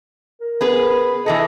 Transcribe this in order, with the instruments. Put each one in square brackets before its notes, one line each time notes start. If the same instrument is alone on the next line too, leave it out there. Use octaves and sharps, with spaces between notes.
[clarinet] A#4
[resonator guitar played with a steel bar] B3 G#4 B4
[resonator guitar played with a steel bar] E3 G#4 A4 [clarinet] D#5